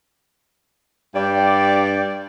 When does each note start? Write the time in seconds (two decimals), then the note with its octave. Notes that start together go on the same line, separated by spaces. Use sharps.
1.15 G2 D5 G5